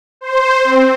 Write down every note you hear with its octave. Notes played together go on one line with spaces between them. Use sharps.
C5
C4